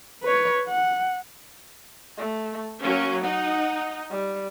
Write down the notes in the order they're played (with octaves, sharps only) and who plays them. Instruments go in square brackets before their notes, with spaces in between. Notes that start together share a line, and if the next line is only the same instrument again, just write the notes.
[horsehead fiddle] B4 C#5
F#5
[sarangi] A3
[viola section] F#3 C#4 [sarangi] A#3
[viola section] D#4 [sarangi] F#5
[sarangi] G3